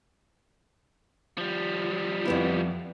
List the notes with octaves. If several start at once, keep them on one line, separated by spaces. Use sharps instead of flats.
F3 G3
F2 B3 E4